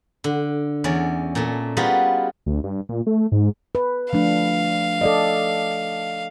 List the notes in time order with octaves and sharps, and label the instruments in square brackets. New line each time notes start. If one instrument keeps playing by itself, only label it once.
[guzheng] D3
E2 C#4 D5
A#2 A3
G3 B3 F4 F#4 G#4 A#4
[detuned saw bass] D2
G2
A#2
A3
G#2
[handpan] B4
[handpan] F3 A3 D4 [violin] F5
[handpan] A4 D5 D#5